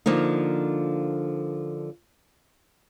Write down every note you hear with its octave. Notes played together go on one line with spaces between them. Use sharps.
D3 F3 A#3 D#4